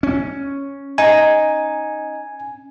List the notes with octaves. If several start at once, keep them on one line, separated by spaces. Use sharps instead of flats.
C#4
D#4 G#5